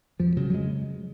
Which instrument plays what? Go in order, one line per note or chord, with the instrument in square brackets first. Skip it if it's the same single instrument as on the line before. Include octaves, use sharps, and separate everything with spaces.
[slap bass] F2 F3
C#3 F#3
F#3
G#3